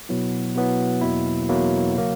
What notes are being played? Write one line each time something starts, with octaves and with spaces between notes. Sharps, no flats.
B2 F#3 B3 E4
B2 F#3 B3 E4
E2 B2 F#3 A#3 E4
E2 B2 F#3 A#3 E4
C#3 F#3 A#3